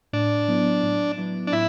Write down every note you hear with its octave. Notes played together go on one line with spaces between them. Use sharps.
A2 D4
F#3 B3 E4
A2
F#3 B3 E4
D4
A2 E4